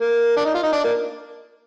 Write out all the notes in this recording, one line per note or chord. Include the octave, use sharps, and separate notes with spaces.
A#3
D4
D#4
F4
D#4
D4
A#3